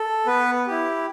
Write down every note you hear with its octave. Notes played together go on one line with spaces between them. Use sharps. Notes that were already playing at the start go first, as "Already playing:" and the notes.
Already playing: A4
B3 B4
E4 G4